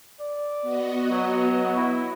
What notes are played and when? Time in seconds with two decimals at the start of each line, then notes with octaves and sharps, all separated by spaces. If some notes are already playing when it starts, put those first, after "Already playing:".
0.19 D5
0.62 B3 F#4 D#5
1.11 F#3
1.77 E4